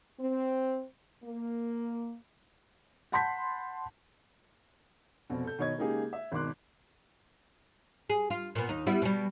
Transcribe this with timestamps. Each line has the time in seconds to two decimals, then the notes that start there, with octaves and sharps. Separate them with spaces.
0.20 C4
1.24 A#3
3.12 F#5 A5 B5 C6 G6 B6
5.30 F1 B2 C4
5.44 A4 G6
5.59 B2 D#3 C#5 D#5 G#6
5.78 C#3 G#3 A#3 D#4 G4 G#4
6.13 E5
6.32 G#1 B2 D#3 C6 D6 F#6
8.10 G#4
8.30 F4
8.55 A#2 B3
8.69 D#2 D#4
8.86 G3 B3 E4
9.02 B2 G3